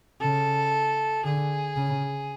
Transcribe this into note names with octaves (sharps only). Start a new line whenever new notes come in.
C#3 A4
D3 G#4
C#3